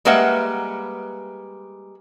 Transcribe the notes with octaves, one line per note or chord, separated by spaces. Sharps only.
G3 G#3 A#3 B4 E5 F#5